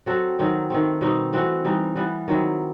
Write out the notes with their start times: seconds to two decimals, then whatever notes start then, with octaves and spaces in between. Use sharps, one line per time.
0.06 F#3 C4 F#4 A4
0.39 D#3 F#3 C4 D#4
0.70 D#3 A3 C4
1.01 B2 G3 C4 D#4
1.33 E3 A3 C4 F#4
1.64 E3 G3 D#4
1.96 E3 G3 B3
2.28 D#3 F#3 C4 E4